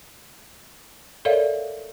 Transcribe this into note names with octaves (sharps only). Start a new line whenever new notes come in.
A4 A#4 C#5 D5 E5 F5